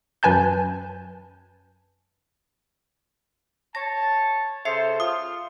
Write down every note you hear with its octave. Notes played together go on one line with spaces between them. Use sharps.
F#2 B4 G#5 A5 G6
C#5 A5 A#6
C#3 A4 C5 E5 C7 C#7
F4 D#6